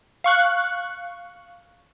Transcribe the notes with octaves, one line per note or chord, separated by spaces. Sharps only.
F5 C#6 F#6